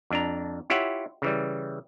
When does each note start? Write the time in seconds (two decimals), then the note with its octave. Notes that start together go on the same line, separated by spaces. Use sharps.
0.10 F2 D4 A#5
0.70 E4 F4 G4 C#5 E5 F#5
1.22 C#3 E3 G3